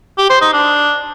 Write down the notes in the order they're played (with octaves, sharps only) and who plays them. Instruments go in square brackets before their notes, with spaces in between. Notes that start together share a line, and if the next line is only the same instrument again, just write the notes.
[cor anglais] G4
C5
D#4
D4